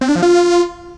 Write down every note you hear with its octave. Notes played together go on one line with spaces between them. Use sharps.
C4
D4
F3
F4